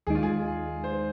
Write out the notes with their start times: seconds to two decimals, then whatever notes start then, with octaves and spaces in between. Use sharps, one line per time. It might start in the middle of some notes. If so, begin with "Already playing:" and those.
0.07 D#2 D#3 G#3 D#4 G#4
0.15 F4
0.23 G#4
0.84 C5